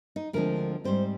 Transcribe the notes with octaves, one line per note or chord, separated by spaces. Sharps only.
D#4
D2 D3 F3 G#3 C4 A#4
G#2 G3 C4 C5